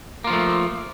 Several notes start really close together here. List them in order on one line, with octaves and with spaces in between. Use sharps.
A#3 F4 F3 A3